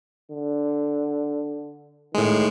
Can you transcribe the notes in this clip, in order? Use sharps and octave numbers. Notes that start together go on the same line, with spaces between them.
D3
A2 D#3 G#3